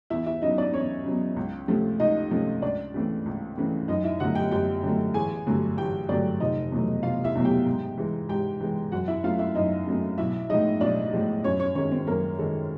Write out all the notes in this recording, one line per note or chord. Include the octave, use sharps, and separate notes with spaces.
E2 E4 E5
E4 E5
C#3 F#3 B3 D#4 D#5
D4 D5
E2 C#4 C#5
C#3 F#3 B3
C#2
C3 F3 A3 C#4
C#2 D#4 D#5
C3 F3 A3 C#4
C#2 D4 D5
C#3 E3 A3 C4
C#2
C#3 E3 A3 C4
F#2 D#4 D#5
E4 E5
D3 F#3 A3 F#4 F#5
G4 G5
F#2 G4 G5
D3 F#3 A3
A1 G#4 G#5
G2 D3 F#3 A3
A1 G4 G5
G2 D3 F#3 A3 D4 D5
F1 D#4 D#5
E2 B2 F#3 A3
F1 F4 F5
E4 E5
E2 B2 F#3 A3
G4 G5
G#2
E3 G#3
G#2 G4 G5
E3 G#3
F#2 F#4 F#5
E4 E5
C#3 F#3 A3 C4 F4 F5
E4 E5
F#2 D#4 D#5
C#3 F#3 A3 C4
B1 E4 E5
A2 F3 G#3 D#4 D#5
B1 D4 D5
A2 F3 G#3
F#2 C#4 C#5
C#4 C#5
D#3 G#3 C#4 C#5
C4 C5
F#2 A#3 A#4
D#3 G#3 A4